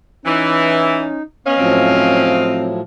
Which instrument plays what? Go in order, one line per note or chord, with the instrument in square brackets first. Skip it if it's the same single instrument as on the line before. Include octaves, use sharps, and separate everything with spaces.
[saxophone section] E3 [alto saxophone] C#4 [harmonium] D#4
[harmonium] B3 [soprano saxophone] C#4 [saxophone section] D#5 F5
[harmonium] A2 F3 F#3 [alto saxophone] C4